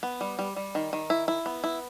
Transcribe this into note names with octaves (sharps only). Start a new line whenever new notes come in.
B3
G3
G3
G3
D#3
D#3
E4
E4
B3
E4